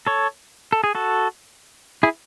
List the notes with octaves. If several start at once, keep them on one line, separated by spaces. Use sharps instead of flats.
A4 C#5
A4
G#4
F#4 A4
E4 G#4